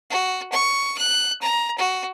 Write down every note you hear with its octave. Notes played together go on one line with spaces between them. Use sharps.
F#4
C#6
F#6
A#5
F#4